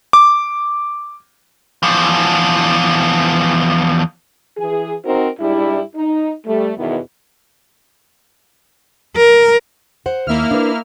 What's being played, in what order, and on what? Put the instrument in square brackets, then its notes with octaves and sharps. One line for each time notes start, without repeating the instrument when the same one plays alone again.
[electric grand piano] D6
[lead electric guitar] E2 F3
[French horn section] E3 G#4
C4 D#4 F#4 A#4 C5
G#2 G3 D4 E4
D#4
G3 A3
E2 B2 D#3 E3 B3
[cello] A#4
[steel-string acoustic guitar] C5 F#5
[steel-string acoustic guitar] D#2 [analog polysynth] A#3 E4 F6
[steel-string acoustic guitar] D4 B4